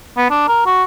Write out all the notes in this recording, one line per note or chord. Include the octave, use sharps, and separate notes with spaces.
B3
D4
A#4
F#4